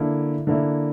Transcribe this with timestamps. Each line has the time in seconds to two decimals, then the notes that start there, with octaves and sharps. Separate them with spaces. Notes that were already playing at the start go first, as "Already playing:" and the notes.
Already playing: D3 A#3 E4
0.47 D3 A#3 E4